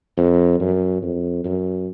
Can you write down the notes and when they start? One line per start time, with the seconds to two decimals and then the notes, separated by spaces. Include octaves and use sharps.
0.18 F2
0.60 F#2
1.02 F2
1.44 F#2